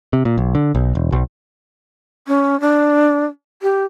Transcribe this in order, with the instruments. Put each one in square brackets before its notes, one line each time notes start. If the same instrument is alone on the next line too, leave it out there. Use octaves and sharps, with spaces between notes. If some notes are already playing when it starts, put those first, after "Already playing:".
[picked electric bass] C3
A#2
B1
D3
B1
E1
B1
[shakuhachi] C#4
D4
G4